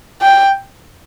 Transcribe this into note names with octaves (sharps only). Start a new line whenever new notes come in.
G5